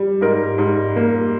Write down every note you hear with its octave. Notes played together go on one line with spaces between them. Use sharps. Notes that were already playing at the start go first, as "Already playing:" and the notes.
Already playing: G3
G#2 A#4
G#2
A#3